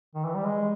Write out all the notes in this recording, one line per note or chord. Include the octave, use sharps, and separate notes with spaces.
D#3
E3
G3
G#3